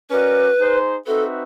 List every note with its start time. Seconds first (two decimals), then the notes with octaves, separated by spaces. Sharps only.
0.09 C#4 F#4 A#4 B4 D5
0.59 D#4 G#4 C5
1.06 C4 D#4 F#4 A4 B4 E5